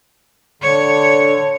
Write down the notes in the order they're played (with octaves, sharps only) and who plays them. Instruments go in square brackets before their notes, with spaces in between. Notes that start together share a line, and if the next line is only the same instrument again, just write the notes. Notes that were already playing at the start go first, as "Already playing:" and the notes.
[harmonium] D3 [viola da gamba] C#5